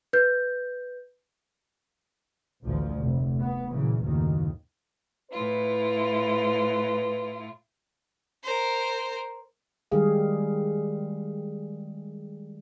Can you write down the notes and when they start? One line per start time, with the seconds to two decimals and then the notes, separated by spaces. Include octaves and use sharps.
0.13 B4 G6
2.63 A1 D2 A2 F3
2.98 F1
3.38 B3
3.71 F#2 A#2 C#3 E3
4.03 F#1 D#2 A2 D#3
5.31 A2 E4 F4 B4
8.43 A#4 C5
9.92 D#3 G3 G#3 G4 G#4 F5